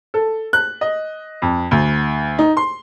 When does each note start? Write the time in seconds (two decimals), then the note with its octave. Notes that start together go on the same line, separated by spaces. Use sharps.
0.14 A4
0.53 F#6
0.81 D#5
1.42 F2
1.71 D2
2.39 D#4
2.57 C6